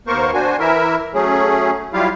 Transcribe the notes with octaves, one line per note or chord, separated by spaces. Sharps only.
D#2 A#3 B3 A#4 C5 C#6
D4 F#4 C5 G#5
E3 E4 A#4 E5
F#3 A3 C#4 G#4
F#3 G3 E4 F4 G4 F5